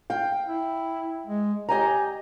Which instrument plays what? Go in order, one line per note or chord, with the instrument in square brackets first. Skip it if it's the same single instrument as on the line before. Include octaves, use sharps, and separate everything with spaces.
[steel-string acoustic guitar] F5 G5
[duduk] E4
G#3
[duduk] G4 [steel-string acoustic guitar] D#5 G#5 A#5